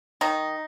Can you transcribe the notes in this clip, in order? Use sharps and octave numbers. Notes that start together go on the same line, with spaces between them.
D#3 D#4